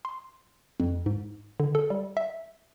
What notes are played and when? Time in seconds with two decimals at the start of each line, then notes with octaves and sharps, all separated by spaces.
0.05 C6
0.80 F2
1.06 G#2
1.60 D3
1.75 A4
1.90 G3
2.17 E5